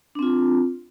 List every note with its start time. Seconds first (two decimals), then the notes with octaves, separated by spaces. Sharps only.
0.15 D4
0.19 C4
0.23 F4